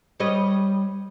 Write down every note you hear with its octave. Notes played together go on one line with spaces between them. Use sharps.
G3 C#5 D#5